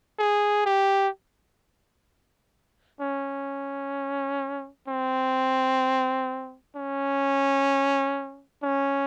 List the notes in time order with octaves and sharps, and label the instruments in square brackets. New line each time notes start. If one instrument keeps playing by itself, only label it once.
[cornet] G#4
G4
C#4
C4
C#4
C#4